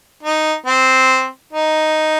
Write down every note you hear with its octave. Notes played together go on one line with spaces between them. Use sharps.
D#4
C4
D#4